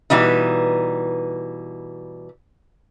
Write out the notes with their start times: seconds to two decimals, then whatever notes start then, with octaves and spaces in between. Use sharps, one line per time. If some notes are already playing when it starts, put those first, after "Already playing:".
0.10 B2 E3 G3 D#4